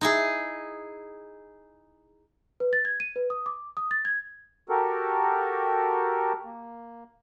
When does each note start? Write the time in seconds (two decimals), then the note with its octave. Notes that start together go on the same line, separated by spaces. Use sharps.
0.01 D#4 E4 G#4
2.60 B4
2.73 A6
2.85 G#6
3.00 D#7
3.16 B4
3.30 D#6
3.46 D6
3.77 D#6
3.91 A6
4.05 G#6
4.69 F#4 G4 A4 A#4
6.45 A#3